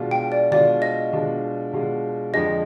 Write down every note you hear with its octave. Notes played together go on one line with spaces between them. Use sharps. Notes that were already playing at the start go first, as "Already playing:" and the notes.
Already playing: B2 G#3 D4 F4
G5
D5
B2 G#3 D4 F4 D5
D#5
B2 G#3 D4 F4
B2 G#3 D4 F4
F2 D3 F3 G#3 D#5